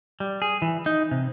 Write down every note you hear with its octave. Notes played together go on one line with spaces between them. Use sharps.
G3
G#4
E3
D#4
C3